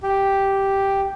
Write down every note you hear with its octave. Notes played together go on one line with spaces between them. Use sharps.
G4